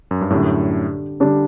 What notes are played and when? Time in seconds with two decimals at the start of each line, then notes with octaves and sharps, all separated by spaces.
0.11 F#2
0.21 G2
0.30 F#2 A2 D3 G3 D4
1.20 D3 G3 D4